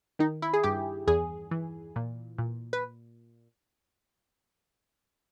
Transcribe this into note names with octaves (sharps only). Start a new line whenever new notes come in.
D#3 D#4
E4
G#4
G2 G4
E2 G#4
E3
A#2
A#2
B4